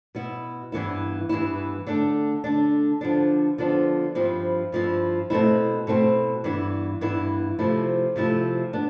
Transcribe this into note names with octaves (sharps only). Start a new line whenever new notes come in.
B2 B3 E4
G2 E3 B3 E4
G2 E3 B3 E4
D3 A3 D4
D3 A3 D4
D3 F3 B3 D4
D3 F3 B3 D4
G2 F3 C4 E4
G2 F3 C4 E4
B2 A3 C4 E4
B2 A3 C4 E4
G2 E3 B3 E4
G2 E3 B3 E4
C3 F3 A3 E4
C3 F3 A3 E4
B3 D4